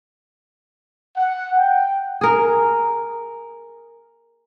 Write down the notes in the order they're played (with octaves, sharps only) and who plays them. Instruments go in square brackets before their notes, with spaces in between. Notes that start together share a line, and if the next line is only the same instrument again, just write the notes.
[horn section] F#5
G5
[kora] G#4 A#4